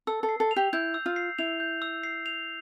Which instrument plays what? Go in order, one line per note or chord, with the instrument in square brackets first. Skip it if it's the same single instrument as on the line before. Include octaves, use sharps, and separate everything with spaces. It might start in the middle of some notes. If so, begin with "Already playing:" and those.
[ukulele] A4 [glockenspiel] E6
[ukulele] A4
[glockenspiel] C7
[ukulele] A4
[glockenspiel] F7
[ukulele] G4
[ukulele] E4 [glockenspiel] G6
[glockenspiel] E6
[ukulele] F4
[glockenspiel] C7
[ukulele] E4 [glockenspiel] F7
[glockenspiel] G6
E6
C7
F7